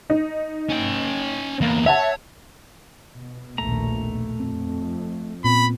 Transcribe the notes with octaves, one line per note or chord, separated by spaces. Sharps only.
D#4
C#4 G5
E2 A#3
C#5 E5 F#5 A5
B2
A#1 D#2 B2 A3 A#5
F2 C4
A#2 B3 C4 B5